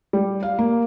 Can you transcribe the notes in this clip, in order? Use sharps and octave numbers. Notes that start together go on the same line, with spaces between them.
G3
F5
A#3